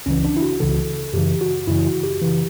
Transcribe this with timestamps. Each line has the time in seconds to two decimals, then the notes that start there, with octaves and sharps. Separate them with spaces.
0.06 C#2 C#3 E3 C#4
0.24 D4
0.37 E4
0.42 F#4
0.60 C#2 C#3 E3 A4
1.13 F#2 C#3 E3 G4
1.41 F#4
1.67 F#2 C#3 E3 E4
1.85 F#4
2.03 G4
2.22 C#3 E3